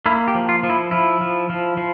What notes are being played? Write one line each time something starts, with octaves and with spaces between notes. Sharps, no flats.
A#3 E4
G4
F3
F4
F3
E4
F3 E4
F3
F3
F3